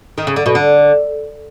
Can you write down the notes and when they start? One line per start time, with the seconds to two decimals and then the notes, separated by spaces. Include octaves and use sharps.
0.18 D#3
0.27 C#3
0.36 D3
0.46 B2
0.55 D3